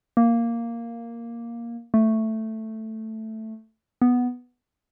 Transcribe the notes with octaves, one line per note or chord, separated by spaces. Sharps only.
A#3
A3
B3